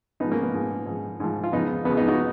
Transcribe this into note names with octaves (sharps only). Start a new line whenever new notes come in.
G#2 F3 B3 D#4
A#3 C#4
B3
G#2 F3
G#2 F3
G#2 F3
F4
F2 C#3 F3 B3 D#4
F2 C#3 F3 B3
B3 D#4
D#4 F#4